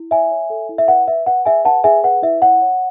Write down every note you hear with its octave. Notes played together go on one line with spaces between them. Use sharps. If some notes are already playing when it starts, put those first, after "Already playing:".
Already playing: E4
C#5 E5 G#5
C#5
A4
E4
E5
B4 F#5
B4 E5
B4 F#5
G#4 E5 G#5
B4 F#5 A5
G#4 E5 G#5
B4 F#5
E4 E5
C#5 F#5
C#5